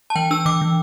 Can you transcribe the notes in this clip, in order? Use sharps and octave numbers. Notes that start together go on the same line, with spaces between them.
A5
E3 G5
D4 E6
E3 D6
E3